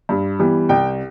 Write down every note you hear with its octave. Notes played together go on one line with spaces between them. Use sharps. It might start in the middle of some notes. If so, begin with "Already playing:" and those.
G2
E3 G3 B3
C2 G5